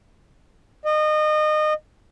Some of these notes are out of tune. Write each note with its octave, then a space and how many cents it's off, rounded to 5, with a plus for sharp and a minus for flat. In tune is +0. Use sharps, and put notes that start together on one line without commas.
D#5 -25